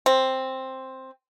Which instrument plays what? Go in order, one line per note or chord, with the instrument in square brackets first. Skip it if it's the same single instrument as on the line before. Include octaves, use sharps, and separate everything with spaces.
[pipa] C4